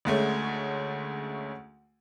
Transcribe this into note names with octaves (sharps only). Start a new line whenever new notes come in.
D2 G#3 A3 C#4